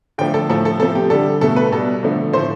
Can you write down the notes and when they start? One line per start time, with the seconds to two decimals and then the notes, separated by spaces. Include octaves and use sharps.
0.18 D3 F3 A3 G5
0.34 A4
0.49 A2 F3 A3 A4
0.65 A4
0.80 C3 F3 A3 A4
0.95 G4
1.10 D3 G3 A4
1.41 B2 A3 A4
1.56 B4
1.72 B2 G3 A4
2.03 D3 F3 A3
2.33 A2 F3 A3 C5